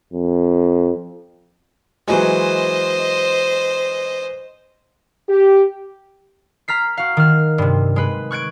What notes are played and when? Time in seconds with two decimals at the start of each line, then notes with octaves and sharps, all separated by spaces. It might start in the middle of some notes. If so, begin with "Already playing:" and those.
0.13 F2
2.08 E3 F#3 G#3 C5 D#5
5.29 G4
6.68 A#5 F6 B6 C7
6.97 F#4 F5
7.17 D#3 F6
7.58 G2 C3
7.96 G#3 B4
8.31 C#6 F#6 G#6 D7